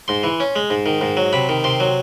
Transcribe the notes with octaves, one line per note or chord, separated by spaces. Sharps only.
G#2 C6
E3
C#4
G#3
G#2
D#3
G#2
F#3
C3 B5
D#3
C3 C6
F#3